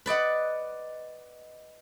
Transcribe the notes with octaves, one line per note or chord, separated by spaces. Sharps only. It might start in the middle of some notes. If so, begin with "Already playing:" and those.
B4 D5 D#5 F#5